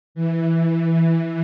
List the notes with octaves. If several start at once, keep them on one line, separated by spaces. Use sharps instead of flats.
E3